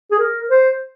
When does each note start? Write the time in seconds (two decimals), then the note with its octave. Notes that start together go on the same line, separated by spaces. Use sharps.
0.11 G#4
0.19 A#4
0.50 C5